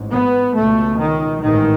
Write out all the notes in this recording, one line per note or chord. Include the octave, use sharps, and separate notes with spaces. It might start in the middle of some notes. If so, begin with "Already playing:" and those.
Already playing: A1 G#2
B3
C#2 B2 A3
D#3
A1 G#2 D#3